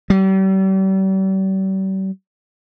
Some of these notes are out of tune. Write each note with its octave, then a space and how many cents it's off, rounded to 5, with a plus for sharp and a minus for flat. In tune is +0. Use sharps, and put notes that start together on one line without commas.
G3 -40